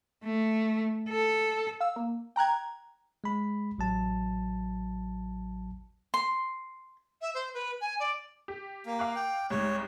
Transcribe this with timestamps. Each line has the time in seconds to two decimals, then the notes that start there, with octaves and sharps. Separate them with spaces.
0.24 A3
1.09 A4
1.80 F5 E6
1.96 A#3
2.36 G5 A#5 F#6 G#6
3.24 G#3 B5
3.78 A1 F#3 A5
6.14 C6
7.21 E5
7.34 C5
7.54 B4
7.81 G#5
7.99 D5
8.48 G4
8.86 A#3
8.99 F5 D6 F#6
9.16 G5
9.50 C2 G#2 C#5